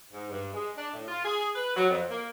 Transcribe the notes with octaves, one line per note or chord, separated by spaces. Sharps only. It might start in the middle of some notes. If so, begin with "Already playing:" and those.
G#2
G2
G#3
D4
A2
F4
G#4
B4
F#3
F2
A#3